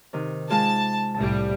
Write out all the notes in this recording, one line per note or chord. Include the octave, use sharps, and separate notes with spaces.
C3 D#3
G#3 F4 G#4 A5
C2 A2 G3 A5